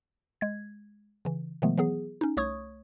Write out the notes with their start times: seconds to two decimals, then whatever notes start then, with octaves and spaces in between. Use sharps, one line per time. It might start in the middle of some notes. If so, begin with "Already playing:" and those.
0.41 G#3 G#6
1.25 C#3 E3
1.62 B2 D#3 F3 G#3 A3 B3
1.78 E3 F#3 B3 G#4
2.21 C#4 D#4
2.37 C2 A3 C#5 C#6 D#6 G#6